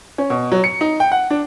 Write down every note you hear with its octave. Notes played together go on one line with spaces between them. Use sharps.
C#4
B2
F#3
C#7
D#4
G5
F#5
D4